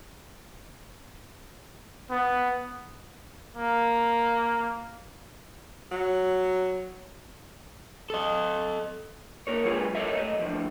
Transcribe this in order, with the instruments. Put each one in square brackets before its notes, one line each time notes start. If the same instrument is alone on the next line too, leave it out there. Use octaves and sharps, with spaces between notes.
[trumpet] B3
[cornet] A#3
[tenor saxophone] F#3
[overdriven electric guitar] A4 D#5
[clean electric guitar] A#3 A#4 C#5
C3 F#3 G#3 F4 G#4 B4
A4 A#4 C#5 D#5 E5
F#2 A3 A4 D#5
A2 D3 F3 F#3